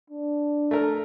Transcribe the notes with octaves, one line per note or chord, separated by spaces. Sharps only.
D4
A3 A#4